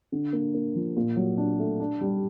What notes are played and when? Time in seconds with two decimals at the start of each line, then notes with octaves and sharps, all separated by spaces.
0.12 D3
0.33 A#3
0.54 A#3
0.75 F3
0.97 A#2
1.16 F#3
1.37 D4
1.59 A3
1.80 D4
2.01 G3